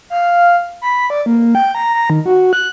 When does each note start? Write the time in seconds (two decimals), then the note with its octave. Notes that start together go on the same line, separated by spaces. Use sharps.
0.10 F5
0.82 B5
1.10 D5
1.26 A#3
1.55 G5
1.75 A#5
1.94 A#5
2.10 D#3
2.26 F#4
2.53 F#6